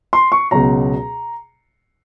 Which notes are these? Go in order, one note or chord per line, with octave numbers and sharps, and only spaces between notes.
C6
C#6
C#2 B2 F#3 A#5